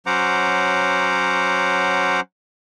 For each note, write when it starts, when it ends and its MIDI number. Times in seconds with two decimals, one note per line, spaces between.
0.06 2.20 54
0.06 2.20 61
0.06 2.20 72
0.06 2.20 78
0.06 2.20 82
0.06 2.20 86